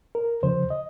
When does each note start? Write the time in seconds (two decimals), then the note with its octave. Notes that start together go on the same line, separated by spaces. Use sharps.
0.15 A#4
0.42 D#2 C#3 F3 C5
0.70 D#5